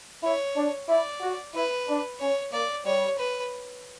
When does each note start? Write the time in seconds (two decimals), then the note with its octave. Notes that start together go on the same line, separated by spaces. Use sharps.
0.23 E4 C#5
0.56 D4
0.88 E4 D5
1.21 F#4
1.54 E4 B4
1.87 D4
2.19 C#4 C#5
2.52 A#3 D5
2.85 G3 C#5
3.18 B4